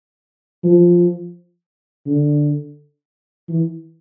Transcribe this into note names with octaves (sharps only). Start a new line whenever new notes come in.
F3
D3
E3